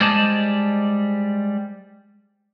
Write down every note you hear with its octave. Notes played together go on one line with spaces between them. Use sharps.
G3 G#3 C5 D5 D#5 A5